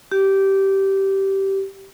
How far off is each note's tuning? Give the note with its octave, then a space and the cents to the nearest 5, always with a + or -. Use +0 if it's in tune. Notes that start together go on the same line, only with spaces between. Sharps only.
G4 -15